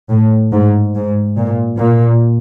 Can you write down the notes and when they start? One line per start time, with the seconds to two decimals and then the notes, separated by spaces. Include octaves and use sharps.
0.10 A2
0.53 G#2
0.95 G#2
1.37 A#2
1.79 A#2